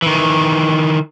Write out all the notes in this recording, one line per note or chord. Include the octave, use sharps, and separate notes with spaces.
D#3 E3